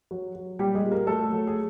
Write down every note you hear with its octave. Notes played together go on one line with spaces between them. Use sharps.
F#3
F#3
A#2 G3 G4
G#3 G#4
A#2
A#3 A#4
F#3 A3 A4
F#3
G#4